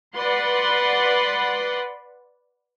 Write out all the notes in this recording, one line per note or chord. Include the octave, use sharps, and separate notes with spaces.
B4 D5 F#5 B5 C6